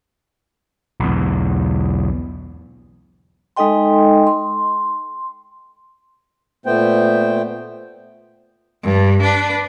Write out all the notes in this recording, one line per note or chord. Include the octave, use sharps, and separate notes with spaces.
B1 E2
G#3 D#4 A4 D#5 G5 C6
C6
A#2 A3 B3 C5 G5
G2
D4 B4